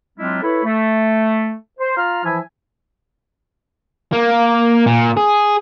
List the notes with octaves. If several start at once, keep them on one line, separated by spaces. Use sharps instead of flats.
F#3 G#3 C4 D4 E4 F4
E4 A4 B4 C#5 E5 B5
A3
C5
F4 F5 A#5 F6
E3 F3 E4 E5 G#5
A#3
A#2
G#4